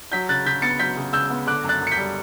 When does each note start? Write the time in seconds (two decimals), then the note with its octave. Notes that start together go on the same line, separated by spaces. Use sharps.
0.12 F#3 G6 B6
0.29 C#3 F#6 A6
0.46 C#3 G6 B6
0.62 B3 A6 C#7
0.79 F#3 G6 B6
0.97 C#3
1.13 C#3 E6 G6
1.30 B3
1.47 D3 D6 F#6
1.64 F#2
1.69 F#6 A6
1.81 F#2
1.87 C#7
1.91 G6 B6
1.98 G3